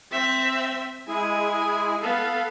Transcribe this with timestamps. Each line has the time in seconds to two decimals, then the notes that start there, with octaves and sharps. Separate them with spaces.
0.12 C4 E5
1.08 G#3 E4 G#4 G#5
2.02 B3 A4 F5